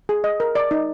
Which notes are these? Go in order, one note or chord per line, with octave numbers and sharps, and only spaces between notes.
G#4
D#5
A#4
D5
D#4